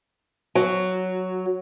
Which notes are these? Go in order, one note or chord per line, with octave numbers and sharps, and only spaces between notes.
F#3